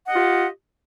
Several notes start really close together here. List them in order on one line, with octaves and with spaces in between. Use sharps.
F#5 D#5 G4 F4